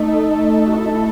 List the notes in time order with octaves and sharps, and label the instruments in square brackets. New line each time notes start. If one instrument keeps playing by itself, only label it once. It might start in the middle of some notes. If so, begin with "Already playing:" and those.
Already playing: [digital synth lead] A3 [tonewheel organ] D#4
[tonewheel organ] F#4
E4
D#4
E4